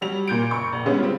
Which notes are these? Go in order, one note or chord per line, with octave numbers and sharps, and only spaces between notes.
F#3 G3 F7
A#2 G6 D7
F#1 C#6
A#1
D3 G3 G#3 B3 C#4
C4 F4